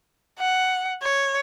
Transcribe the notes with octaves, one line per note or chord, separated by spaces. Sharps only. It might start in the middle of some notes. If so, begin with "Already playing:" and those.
F#5
C#5